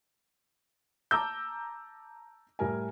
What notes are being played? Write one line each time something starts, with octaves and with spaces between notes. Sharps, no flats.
A5 A#5 D6 E6 G6
A2 G3 A#4 G#5